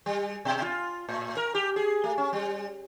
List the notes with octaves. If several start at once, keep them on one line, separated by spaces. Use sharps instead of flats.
G3
B2
F4
A2
A#4
G4
G#4
A3
C#4
G3